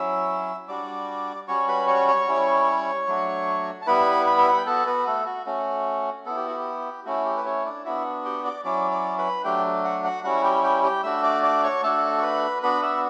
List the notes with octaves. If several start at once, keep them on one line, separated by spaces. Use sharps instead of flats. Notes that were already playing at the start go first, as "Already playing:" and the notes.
Already playing: F#3 C#4 E4 E5 E6
G3 D4 F#4 D5 D6
G3 C#4 F#4 C#5 C#6
B4 B5
C#5 C#6
C#5 C#6
G3 C#4 E4
F#3 A3 D4 F#4
A5
G3 B3 E4 B4 B5
B4 B5
E5
F#5
G5
B3 F#4 A4 A5
B3 B4
A3 A4
F#4
A3 C#4 F#4
B3 E4 A4
G4
F#4
G4
A3 C#4 E4 F#4
G4
B4
C#4 C#5
D4 D5
B3 D4 E4 F#4 E5
G4 G5
D5 D6
F#3 C#4 E4 D5 D6
D5 D6
B4 B5
F#3 A3 D4 G4 G5
F#4 F#5
F#4 F#5
G3 C#4 E4 F#4 F#5
G4 G5
G4 G5
G4 G5
A3 D4 F#4 E5 E6
D5 D6
D5 D6
C#5 C#6
A3 D4 F#4 A4 A5
C#6
B4 B5
B3 D4 F#4 B4 B5
E5 E6